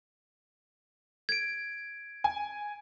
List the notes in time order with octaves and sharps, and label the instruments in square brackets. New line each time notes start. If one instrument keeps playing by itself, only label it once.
[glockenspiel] G#6 D7
[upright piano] G#5